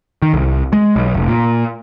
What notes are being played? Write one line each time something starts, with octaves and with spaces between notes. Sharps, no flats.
D#3
C2
G#3
B1
F1
A#2